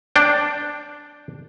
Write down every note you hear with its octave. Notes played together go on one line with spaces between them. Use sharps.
D4 G5